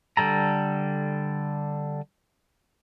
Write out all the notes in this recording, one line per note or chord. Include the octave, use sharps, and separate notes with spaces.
D3 G3 A4 A#5